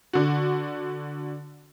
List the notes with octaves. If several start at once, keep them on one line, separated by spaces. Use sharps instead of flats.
D3 F#4